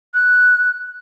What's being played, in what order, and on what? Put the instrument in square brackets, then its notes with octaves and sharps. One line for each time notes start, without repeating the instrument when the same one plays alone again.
[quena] F#6